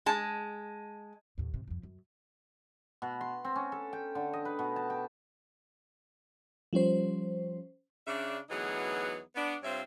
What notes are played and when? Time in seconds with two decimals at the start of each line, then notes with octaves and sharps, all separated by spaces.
0.06 G#3 A5
1.38 D#2 A2
1.54 G#2 C3
1.68 F2 F3
1.83 F#2
3.02 B2
3.21 C6
3.45 C4
3.56 C#4
3.72 A4
3.93 G5
4.15 D3
4.33 D#5
4.45 B4
4.59 B2
4.76 A5
4.90 G5
6.73 F3 G3 C#4 C5
8.07 C#3 D4 E5
8.49 D2 E3 F#3 B3 D#4 G#4
9.36 B3 D4
9.63 G2 C4 F4 C5 C#5 E5